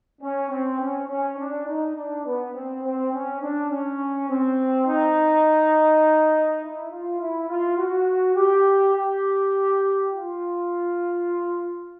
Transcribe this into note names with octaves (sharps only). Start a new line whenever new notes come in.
C#4
C4
C#4
C#4
D4
D#4
D4
B3
C4
C4
C#4
D4
C#4
C4
D#4
E4
F4
E4
F4
F#4
G4
G4
F4